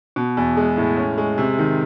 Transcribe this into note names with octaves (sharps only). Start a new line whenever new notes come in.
B2
E2
G#3
A2
C#4
G#3
C3
D#3